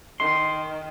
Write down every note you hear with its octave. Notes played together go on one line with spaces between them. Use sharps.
D#3 C6